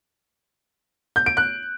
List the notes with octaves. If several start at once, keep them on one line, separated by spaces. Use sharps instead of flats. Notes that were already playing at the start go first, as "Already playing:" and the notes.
G6
D7
F#6